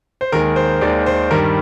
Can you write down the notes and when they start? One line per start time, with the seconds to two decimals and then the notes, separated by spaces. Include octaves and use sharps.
0.21 C5
0.32 D#2 D#3 G#3 A#4
0.56 C5
0.81 D#2 D#3 G#3 D5
1.06 C5
1.31 G2 D#3 G3 A#4